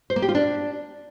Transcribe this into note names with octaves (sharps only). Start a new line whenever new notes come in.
C5
A#3
G4
F4
D4